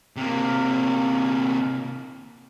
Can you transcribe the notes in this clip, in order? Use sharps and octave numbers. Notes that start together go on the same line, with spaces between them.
C3 A#3